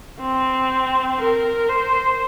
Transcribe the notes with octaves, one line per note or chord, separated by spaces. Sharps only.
C4
A#4
C5